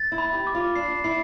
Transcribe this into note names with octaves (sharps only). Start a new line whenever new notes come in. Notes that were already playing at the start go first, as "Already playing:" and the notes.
Already playing: A6
E4
B5
G4
D6
F4
D4 C7
E4 C7